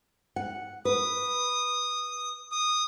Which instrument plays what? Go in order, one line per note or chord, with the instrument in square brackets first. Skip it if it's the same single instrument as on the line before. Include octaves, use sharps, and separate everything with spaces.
[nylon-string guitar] F#5
[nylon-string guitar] B4 [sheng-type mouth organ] D#6
[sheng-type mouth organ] D#6